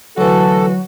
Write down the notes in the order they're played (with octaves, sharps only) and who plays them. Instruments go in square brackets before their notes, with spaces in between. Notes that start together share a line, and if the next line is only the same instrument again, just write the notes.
[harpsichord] D2 E3 [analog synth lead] F#3 [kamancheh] F#4 [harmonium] A4